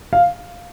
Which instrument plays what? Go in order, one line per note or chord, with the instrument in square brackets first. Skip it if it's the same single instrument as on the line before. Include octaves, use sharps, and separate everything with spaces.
[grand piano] F5